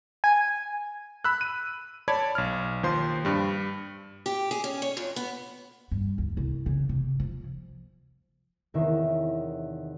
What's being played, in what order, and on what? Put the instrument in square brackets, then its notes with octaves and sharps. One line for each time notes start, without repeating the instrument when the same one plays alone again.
[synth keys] G#5
[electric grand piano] B5 E6 F#6
D#7
C#5 D5 A5 B5 G#6
B1 F6
D#2 F3 C5 C6
G2 G3
[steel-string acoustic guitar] G4
G#4
C#4
C#5
F2
B3
[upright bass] G2
D2
C2
C#3
C3
F3
[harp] E2 C3 D#3 A#4 C#5 E5